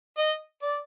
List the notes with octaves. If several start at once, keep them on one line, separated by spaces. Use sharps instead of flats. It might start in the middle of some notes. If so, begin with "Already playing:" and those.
D#5
D5